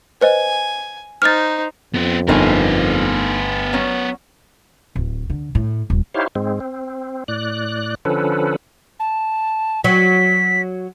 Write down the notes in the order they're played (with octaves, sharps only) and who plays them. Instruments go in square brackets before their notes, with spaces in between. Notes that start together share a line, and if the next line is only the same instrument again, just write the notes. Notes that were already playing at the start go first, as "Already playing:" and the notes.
[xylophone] B4 C5 D#5 [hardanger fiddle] G#5
[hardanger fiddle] D#4 C5 [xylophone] F6 A6
[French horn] F2 [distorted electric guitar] B3 C5
[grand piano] G1 [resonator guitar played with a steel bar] G#3 A3 D#4 [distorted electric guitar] B3 A#4
[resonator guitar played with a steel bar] F#3 C#4
[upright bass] D1
D3
A2
D#1
[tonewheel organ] D#4 E4 G4 C5 C#5 F5
G#2 G#3 C4
C4
A2 D5 F#6
D3 F3 C#4 A4 B4
[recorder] A5
[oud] F#3 [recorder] B6